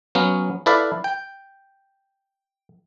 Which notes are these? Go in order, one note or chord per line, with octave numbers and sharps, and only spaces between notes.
F#3 B3 C#4 F5
E4 A4 B4 D5 E5 F5
G5